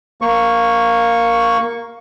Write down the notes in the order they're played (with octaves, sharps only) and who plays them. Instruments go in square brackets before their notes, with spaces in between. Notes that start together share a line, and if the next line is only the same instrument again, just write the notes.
[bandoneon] A#3 C#6